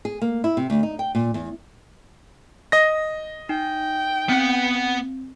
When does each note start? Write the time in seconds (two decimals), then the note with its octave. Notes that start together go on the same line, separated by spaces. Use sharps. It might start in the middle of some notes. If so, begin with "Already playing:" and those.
0.05 G#4
0.22 A#3
0.44 E4
0.57 C3
0.70 D2
0.83 D#4
0.99 G5
1.15 A#2
1.34 E2
2.72 D#5 A#6
3.49 D#4 G5
4.29 B3 C4 F#5